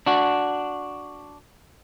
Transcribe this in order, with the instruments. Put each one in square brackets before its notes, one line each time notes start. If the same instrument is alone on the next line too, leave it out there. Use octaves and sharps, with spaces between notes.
[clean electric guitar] D4 F#4